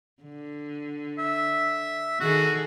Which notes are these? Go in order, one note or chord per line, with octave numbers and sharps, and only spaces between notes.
D3
E5
D#3 F#4 G#4 A4